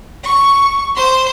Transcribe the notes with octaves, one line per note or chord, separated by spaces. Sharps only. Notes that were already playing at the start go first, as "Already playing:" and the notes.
C#6
C5 C6